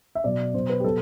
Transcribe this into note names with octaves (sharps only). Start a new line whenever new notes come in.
E5
B2 F#3 D5
B2 F#3 C5
B4
G4
B2 F#3 A4